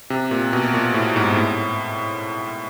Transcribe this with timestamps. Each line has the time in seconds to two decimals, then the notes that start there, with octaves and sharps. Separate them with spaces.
0.10 C3
0.31 A#2
0.53 B2
0.74 A#2
0.94 A2
1.16 G#2
1.36 A2